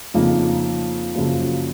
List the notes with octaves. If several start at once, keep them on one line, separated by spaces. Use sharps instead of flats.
F2 C#3 F3 A#3 D#4
F#2 C#3 F3 A#3